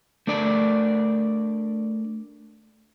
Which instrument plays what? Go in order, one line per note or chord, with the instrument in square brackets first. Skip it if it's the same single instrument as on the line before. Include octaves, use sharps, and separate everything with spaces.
[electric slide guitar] A3 D4 A#4 D5